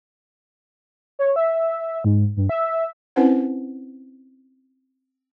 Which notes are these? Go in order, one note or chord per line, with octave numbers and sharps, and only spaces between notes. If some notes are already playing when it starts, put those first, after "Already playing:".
C#5
E5
G#2
G2
E5
C4 C#4 E4 B4 C5 F#5